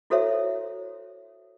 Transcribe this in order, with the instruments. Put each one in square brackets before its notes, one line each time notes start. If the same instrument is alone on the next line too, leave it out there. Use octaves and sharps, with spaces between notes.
[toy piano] E4 F#4 A4 C5 C#5 E5